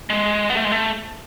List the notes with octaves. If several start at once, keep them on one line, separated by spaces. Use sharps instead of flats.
G#3
B3
A3
G#3
A3